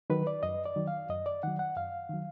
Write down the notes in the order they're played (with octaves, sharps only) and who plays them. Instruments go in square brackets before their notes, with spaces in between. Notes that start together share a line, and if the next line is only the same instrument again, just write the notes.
[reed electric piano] D#3 F#3 B4
D5
F#2 D#5
D5
D#3 F#3
F5
F#2 D#5
D5
D#3 F#3 F#5
F#5
F#2 F5
D#3 F#3